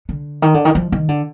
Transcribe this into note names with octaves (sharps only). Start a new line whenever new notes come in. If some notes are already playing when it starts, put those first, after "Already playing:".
D3
D#3
D3
D#3
F3
D#3
D3